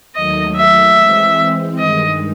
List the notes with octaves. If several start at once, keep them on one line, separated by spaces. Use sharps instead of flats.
D#2 D#3 F#3 A3 D#5
E5
E3 G#3 C4
G2 D#3 G#3 D#5